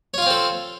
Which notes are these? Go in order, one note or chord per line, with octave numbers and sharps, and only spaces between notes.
C4 F4 A4 C#5 F5